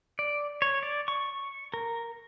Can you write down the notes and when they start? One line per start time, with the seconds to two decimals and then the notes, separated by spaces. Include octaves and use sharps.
0.19 D5
0.62 C#5
0.83 D5
1.08 C#6
1.74 A#4